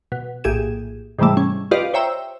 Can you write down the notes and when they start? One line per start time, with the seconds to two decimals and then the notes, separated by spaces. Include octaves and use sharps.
0.12 B2
0.44 A#1 A2 G4 G#4 G#6 E7
1.19 G#2 C3 D#3 E3 G3 A3
1.37 C#4
1.71 F4 G4 B4 D5 D#5 F5
1.94 C5 C#5 E5 G5 A#5 E6